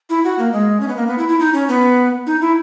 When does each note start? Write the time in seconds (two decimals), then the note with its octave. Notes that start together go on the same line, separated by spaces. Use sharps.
0.09 E4
0.24 F#4
0.39 A#3
0.52 G#3
0.80 C#4
0.88 B3
0.96 A#3
1.07 B3
1.18 E4
1.28 E4
1.39 D#4
1.54 C#4
1.69 B3
2.26 D#4
2.41 E4